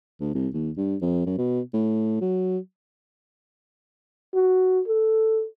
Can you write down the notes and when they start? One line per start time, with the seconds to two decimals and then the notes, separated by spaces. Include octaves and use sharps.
0.21 D2
0.35 C2
0.54 D#2
0.77 G2
1.01 F2
1.26 F#2
1.38 B2
1.74 A2
2.21 F#3
4.34 F#4
4.87 A4